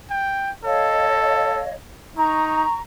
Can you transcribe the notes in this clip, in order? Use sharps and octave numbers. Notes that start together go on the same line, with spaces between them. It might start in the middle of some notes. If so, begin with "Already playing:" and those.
G5
A4 C#5 D#5 F5
D#4 A#5 C#6